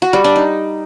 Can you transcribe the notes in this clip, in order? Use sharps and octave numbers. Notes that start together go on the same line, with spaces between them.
F#4
G3
D4
D#4